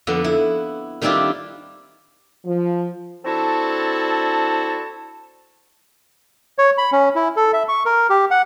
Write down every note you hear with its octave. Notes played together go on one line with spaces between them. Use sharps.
F2 D3 B3
E4
D#3 G3 C4 D4 E4 F4
F3
C4 D4 E4 F#4 A4 A5
C#5
B5
C#4
E4
A4
E5
C#6
A#4
G4
F#5